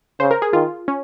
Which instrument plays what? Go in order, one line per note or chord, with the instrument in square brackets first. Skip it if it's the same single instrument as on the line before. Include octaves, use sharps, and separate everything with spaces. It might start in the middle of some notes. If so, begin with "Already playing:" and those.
[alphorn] C#3 [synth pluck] C5
[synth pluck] A#4
G#4
[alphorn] D#3 [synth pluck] F4
[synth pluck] C#4